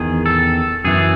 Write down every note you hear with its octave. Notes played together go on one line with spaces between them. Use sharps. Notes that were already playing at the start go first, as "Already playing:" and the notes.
Already playing: E2 D#3 G#4
A4
F#2 E3 G#4